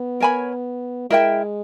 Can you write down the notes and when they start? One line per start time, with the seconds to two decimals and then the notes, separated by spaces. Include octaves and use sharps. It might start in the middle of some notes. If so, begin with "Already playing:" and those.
Already playing: B3
0.20 A#4 C#5 G#5 B5
1.10 G#3 E4 A#4 E5 G5